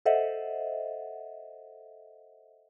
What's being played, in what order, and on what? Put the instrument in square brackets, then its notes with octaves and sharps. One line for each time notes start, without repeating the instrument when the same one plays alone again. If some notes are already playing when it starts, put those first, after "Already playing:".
[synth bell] A4 C5 D#5 E5 F#5